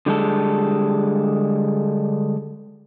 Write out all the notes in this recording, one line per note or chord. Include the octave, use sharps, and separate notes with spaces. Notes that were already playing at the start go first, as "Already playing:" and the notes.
D3 G3 G#3 A4